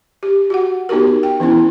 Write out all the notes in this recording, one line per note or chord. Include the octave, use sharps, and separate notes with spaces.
G4
F#4 F#5
B3 D#4 F#4 G4 A#4
G5
E3 B3 C#4 E4